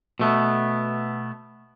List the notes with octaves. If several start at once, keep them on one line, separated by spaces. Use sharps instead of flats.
B2 A3 B3